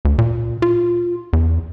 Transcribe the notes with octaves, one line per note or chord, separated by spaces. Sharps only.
D2
A#2
F4
E2